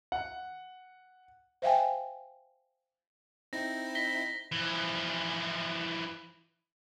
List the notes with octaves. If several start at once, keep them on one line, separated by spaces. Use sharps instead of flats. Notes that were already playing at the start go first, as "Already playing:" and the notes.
F#5
C5 E5 F5 G5 G#5
C4 D#4 E4 A#6
A#6 B6 G7
E3 F3